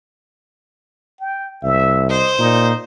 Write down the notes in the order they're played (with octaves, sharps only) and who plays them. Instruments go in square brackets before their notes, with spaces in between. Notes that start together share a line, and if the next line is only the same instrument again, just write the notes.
[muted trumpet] G5
[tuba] C2 [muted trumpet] E5
[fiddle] C5 [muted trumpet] D#5
[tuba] A#2 [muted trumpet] D#4